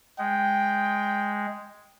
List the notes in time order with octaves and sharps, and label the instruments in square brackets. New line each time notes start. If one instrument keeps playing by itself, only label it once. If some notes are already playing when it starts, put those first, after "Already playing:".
[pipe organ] G#3 [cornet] G5